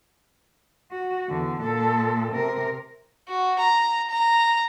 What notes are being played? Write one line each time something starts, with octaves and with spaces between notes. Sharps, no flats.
F#4
E2 D3
A#2 A4
C3 A#4
F#4
A#5
A#5